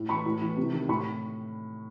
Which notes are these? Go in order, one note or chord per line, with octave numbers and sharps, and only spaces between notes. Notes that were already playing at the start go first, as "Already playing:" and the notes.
Already playing: A2
E3 B5 C#6
A2
E3
C3
D#3
A2 B5 C#6